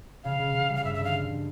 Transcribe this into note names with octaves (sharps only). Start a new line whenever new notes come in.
C#3 F5
C#3
C#3
G3
F5
G2 E5
E5
D3 F5
D3
D3